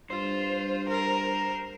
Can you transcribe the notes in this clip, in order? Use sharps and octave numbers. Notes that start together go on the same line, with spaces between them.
G2 F4 C5
A#4